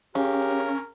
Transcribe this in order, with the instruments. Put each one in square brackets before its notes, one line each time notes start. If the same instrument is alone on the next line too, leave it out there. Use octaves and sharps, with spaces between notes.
[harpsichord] C#3 [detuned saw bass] C#4 [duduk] G4 [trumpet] A#4